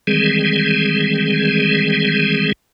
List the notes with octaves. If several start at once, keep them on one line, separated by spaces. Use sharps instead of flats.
D#3 E3 G3 G#3 C4 G#4